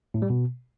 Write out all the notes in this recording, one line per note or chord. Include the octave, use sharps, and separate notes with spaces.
A2
G3
B2